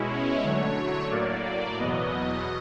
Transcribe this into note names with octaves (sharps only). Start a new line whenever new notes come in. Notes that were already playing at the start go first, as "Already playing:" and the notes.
Already playing: B2 G#3 C#4 E4
C#5
D3 F#3 A3 C#5
A2 F#3 A#3 D5
D5
E2 B2 F#3 B3 D#5